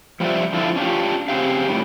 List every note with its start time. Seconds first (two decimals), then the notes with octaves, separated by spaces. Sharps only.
0.20 F3 G3 F4 C5 D5 E5
0.53 D3 F3 E4 F4
0.76 C#4 D4 F4 G4
1.28 C#3 C4 C#4 G4 F5
1.68 A2 D#3 G3